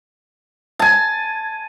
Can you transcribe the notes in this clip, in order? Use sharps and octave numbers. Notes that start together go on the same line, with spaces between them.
G#5 A5